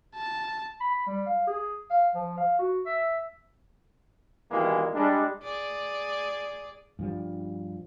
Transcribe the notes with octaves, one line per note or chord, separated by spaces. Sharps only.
A5
B5
G3
F5
G#4
F5
F3
F5
F#4
E5
B2 D#3 E3 G3 G#3 A#3
G3 G#3 D4
G#4 D5
G2 F3 G3